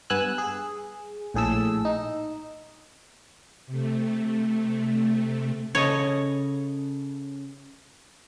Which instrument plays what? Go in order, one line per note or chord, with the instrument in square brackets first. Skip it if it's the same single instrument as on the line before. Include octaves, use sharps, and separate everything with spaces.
[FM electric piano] G2 B3 G#5 E6 F#6
G#4
A#1 A2 G#4 A4 E6
D#4
[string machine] C3 A3
[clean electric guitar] C#3 A4 D#5 [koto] C#5